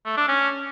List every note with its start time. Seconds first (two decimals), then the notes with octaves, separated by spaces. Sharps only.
0.06 A3
0.17 D4
0.29 C#4